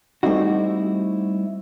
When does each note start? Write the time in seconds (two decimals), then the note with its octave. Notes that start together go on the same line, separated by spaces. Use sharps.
0.23 G3 A3 C4 D#4 E4 F#4